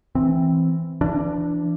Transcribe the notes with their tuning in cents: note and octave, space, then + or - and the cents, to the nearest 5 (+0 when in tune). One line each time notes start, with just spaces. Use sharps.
E3 +0 C4 +0
E3 +40 D4 +0